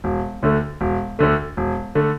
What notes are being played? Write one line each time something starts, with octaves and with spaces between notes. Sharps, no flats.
E1
D2 D3 A3
E1
D2 D3 A3
E1
D3 A3